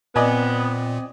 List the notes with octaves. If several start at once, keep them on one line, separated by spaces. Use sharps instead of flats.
A#2 B3 C4 D5 D#5 G#5